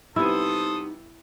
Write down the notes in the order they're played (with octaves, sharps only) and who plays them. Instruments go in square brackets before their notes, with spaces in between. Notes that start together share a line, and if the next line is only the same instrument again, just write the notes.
[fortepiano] C3 G3 B3 [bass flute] D#4 [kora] E4 [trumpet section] A4 C5 D#6